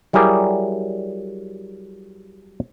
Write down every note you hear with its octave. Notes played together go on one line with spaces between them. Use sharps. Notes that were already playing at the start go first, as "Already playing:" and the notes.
F#3 G3 E4 G#4 A#4 D5